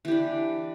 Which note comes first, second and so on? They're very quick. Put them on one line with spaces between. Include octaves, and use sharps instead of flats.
E3 G4 D4